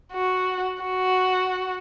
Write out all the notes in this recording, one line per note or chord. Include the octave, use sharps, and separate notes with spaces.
F#4
F#4